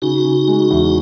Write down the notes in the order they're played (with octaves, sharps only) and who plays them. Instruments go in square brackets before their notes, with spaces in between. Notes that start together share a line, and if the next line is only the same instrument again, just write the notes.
[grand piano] C#3 [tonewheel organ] D#4 F#4
[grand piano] C#3
G#3
E2